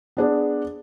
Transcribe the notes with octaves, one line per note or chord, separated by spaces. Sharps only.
B3 D4 G#4